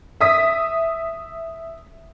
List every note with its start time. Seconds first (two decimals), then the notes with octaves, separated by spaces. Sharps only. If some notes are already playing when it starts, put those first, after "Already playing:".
0.20 E5 D#6 B6